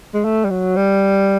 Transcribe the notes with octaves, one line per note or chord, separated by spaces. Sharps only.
G#3
A3
G3
F#3
G3